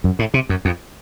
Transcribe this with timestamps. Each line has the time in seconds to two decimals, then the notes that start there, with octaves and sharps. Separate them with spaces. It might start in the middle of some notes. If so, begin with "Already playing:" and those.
0.04 F#2
0.19 A2
0.34 C3
0.49 F#2
0.65 F2